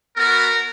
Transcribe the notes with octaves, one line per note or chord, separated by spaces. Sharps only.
B3 F#4 A#4